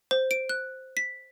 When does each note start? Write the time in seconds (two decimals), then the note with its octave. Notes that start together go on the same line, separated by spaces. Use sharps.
0.11 C5
0.31 D7
0.49 F#6
0.97 B6